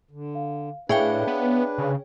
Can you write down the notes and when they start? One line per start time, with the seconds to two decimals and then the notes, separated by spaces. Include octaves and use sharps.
0.11 D3
0.35 F5
0.89 A2 D4 G#4 B4 C#5 E5 F5 G5
1.27 B3
1.78 C#3